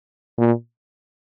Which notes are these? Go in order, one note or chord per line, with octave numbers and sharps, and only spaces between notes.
A#2